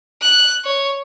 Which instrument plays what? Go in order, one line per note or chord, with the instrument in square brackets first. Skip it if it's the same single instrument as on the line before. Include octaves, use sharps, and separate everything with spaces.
[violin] F#6
C#5